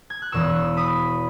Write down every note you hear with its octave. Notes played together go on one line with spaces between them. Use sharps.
G#6
F#6
E1 E2 B2 C#6 E6
B5 D#6